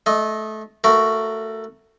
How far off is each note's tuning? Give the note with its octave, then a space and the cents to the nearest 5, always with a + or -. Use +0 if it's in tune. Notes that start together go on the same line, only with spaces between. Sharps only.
A3 -20 D#5 +0
A3 +15 F#4 +0 A#4 +0